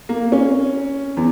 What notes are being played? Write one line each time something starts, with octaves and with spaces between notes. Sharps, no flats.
A#3
C#4
E2